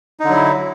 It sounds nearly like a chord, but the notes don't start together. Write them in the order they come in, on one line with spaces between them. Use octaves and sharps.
D#4 D3 F#3 E4